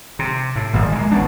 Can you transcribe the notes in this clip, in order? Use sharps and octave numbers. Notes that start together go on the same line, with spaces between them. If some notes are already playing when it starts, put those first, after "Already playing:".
C3
A2
G#1 A#2 F3
G#3 A#3
G#1 B3 C#4 D4